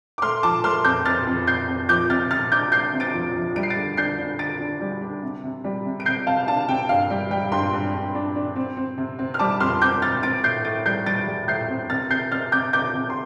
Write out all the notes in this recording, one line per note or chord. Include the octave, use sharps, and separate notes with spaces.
D6
A3 C6 F6
F3 A5 D6
A3 C6 F6
F2 D6 G6
F2 F6 A6
F2
F2 G6 C7
F2
F3 D6 G6
C3 F6 A6
C3 F6 A6
D4 D6 G6
D4 G6 C7
C3
A6 D7
F3
F3
G3 D7
C7
A6 D7
D3
D4 G6 C7
D4
D3 A6 D7
D4
G3
D4
C3
C3
G3
C3
D7
C3 G6 C7
C3 F5 A5
D4 F5 A5
C3 G5
G2 F5
G3 G5
G3 G5
G2 G5 C6
G2
G2
D4
D4
C4
C4
C3
C4
F6
G3 A5 D6
F2 C6 F6
C4 D6 G6
C4 F6 A6
C4 A6 D7
A2 G6 C7
A2 A6 D7
G3 G6 C7
G3 A6 D7
G3
A2 G6 C7
C4
C3 F6 A6
C3 G6 C7
C3 F6 A6
C3 D6 G6
C3 D6 G6
C3
C6